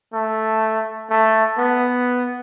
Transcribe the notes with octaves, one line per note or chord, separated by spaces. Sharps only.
A3
A3
B3